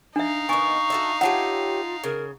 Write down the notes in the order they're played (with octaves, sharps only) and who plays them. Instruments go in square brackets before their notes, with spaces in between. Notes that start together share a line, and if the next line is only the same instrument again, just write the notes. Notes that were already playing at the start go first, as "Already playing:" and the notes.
[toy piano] D4 E5 [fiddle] D#4 F5
[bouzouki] D#3 B3 [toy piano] G#5 [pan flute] C#6
[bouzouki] F#4 A4 E5
[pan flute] F4 [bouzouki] G4 C#5 E5 [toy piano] F#5 A5
[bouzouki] C#3 [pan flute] A#4